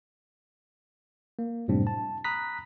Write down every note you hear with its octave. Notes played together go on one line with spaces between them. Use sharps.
A#3
F#2 A2 C3 G3 C4 D4
A5
A#5 B5 D#6 F#6 A#6 B6